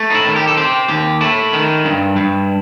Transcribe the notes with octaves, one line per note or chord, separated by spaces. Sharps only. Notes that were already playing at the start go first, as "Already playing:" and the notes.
Already playing: A3
D#4
E4
D#3
G4
A4
C4 G4
D#2 G4
A3 E4
D#3
G2
G2